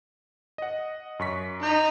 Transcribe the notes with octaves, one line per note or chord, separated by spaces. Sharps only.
D#5 F#5
F#2 C#6 B6
D#4 A#5 G6